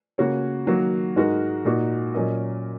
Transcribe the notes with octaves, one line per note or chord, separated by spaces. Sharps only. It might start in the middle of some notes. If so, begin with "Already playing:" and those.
C#3 A#3 F#4 C#5
D#3 F#3 A#3 F#4
G#2 G#3 D#4 F#4 A#4
A#2 A#3 D#4 F#4
A#2 F#3 C#4 A#4 D#5